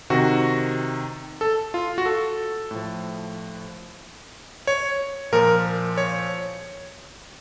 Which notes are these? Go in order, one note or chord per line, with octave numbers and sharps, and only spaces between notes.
C3 D#3 F#4
A4
F4
F#4
A4
A2 F3
C#5
A#2 F3 A#4
C#5